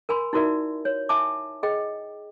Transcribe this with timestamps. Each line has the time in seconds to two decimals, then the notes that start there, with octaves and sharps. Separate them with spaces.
0.09 A#4 G#5 B5 C6
0.33 D#4 E4 F#4 A#4 D5 E5
0.85 C#5
1.09 E5 G#5 A5 D6
1.63 G#4 D#5 G5